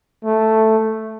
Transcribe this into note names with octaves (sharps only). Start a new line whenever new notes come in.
A3